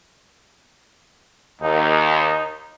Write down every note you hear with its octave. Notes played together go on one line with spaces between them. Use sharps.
D#2 D#4